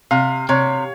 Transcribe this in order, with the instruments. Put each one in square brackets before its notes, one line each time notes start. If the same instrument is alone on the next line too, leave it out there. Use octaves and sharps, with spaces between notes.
[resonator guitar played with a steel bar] C3 [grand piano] F5
[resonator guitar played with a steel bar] C3 [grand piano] C#5